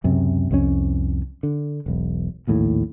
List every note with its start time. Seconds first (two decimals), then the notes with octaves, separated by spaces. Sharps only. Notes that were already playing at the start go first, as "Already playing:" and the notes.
0.04 C#2 F#2 C3
0.51 C2 F2 G#3 C#4
1.43 D3
1.86 E1 B1
2.47 A#1 D#2 A2